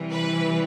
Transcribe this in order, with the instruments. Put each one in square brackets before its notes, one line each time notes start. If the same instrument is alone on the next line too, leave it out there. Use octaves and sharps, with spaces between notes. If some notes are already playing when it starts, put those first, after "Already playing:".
Already playing: [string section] C3 E3 G3
B4